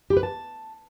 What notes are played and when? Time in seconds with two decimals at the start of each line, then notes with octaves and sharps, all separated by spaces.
0.10 G4
0.17 B4
0.23 A5